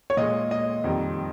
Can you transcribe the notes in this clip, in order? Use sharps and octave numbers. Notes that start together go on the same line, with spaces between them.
C#5
A#2 G#3 D#5
D#5
F2 D#3 G3